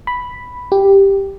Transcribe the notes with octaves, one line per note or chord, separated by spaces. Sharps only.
B5
G4